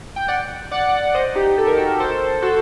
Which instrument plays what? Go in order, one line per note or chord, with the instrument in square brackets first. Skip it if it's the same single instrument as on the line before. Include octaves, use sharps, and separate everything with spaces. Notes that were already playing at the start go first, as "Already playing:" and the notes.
[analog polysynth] G5
D5 F#5
D5 F#5
C5 D#5
D#4 G4
A4
A#4
F#4 A4
A4 C5
F#4 A4